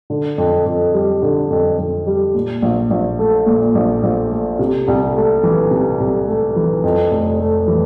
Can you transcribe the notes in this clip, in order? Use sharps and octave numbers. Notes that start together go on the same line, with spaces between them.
D3
F2
F2
G3
D3
F2
F2
G3
A#2
A#1
A#1
A3
A#2
A#1
A#1
A3
C3
C2
A3
E3
C3
C2
A3
E3
F2
F1
A3
E3